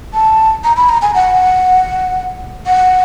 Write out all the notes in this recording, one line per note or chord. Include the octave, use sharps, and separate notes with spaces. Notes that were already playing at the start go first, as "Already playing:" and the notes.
A5
A#5
B5
A#5
G#5
F#5
F#5